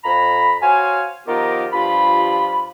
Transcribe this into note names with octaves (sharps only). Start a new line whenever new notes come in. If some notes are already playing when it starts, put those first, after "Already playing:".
F2 A#5 B5
F#4 C5 C#5 F5 G#5
D#3 F3 B3 F4 G4 A#4
G2 F3 F4 G4 B5